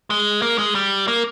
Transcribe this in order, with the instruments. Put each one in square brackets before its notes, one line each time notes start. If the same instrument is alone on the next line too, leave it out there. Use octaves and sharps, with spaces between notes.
[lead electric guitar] G#3
A#3
G#3
G3
A#3